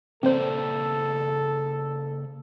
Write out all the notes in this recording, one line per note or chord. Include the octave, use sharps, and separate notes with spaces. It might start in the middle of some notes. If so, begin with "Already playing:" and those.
C#3 A#3 C4 A4 C5 D5